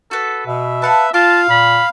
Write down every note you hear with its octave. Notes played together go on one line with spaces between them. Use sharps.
F#4 A4 B4
B2 E5
B4 F5 F#5 A5
F4 F5 A5 C6 D6
A#2 B5